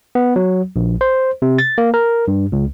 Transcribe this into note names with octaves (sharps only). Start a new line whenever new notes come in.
B3
F#3
A#1
C5
C3
A6
A#3
A#4
G2
C#2